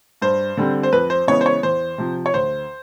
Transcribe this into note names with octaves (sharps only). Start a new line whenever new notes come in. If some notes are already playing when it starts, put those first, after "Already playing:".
G2 C5
D3 G3 C4
C5
F2 B4
C5
C#3 E3 G#3 B3 C#5
C5
C#5
E2 C5
C3 F3
C#5
D2 C5